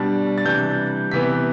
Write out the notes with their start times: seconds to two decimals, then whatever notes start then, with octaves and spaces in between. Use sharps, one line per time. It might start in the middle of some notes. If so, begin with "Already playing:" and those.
Already playing: B2 G3 D4
0.38 A6
0.45 C3 E3 G3 D4 G6
1.11 C3 E3 B3 B6